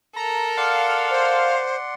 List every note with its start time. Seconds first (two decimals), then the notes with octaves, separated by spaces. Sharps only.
0.16 A4 A#4 A#5
0.57 D5 F5 F#5 C6
1.10 C5